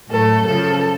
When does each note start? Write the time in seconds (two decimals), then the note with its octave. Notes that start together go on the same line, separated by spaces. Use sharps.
0.10 A2 F#3 A3 A4
0.45 F#2 C#3 F3 A4